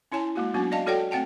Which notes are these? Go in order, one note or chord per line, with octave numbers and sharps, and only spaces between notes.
C#4 E4 C#5 G#5 A5
G#3 A#3 F#4
F#3 B3 C#4 D4 F#4
D5 D#5 F5 A5
F#4 A4 C#5 D5 F#5 G5
A3 C4 F#5 G5 A5